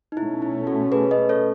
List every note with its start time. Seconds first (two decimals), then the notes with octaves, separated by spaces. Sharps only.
0.12 D#4
0.17 B2 A3 C#4 E4
0.42 E4
0.67 F#4 A4
0.92 G#4 B4
1.11 B4 D#5
1.29 A4 C#5